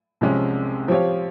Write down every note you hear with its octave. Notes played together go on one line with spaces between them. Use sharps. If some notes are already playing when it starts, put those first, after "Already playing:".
C2 C3 F3 G#3 C#4
F3 C4 G4 C#5 F5